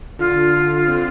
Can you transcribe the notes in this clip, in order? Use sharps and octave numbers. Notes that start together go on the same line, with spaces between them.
D3 F4
D3
C4